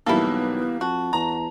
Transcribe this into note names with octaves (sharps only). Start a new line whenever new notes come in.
B1 E3 G3 A#3 B3 E4 A4
F2 F#4 A5
E2 A#5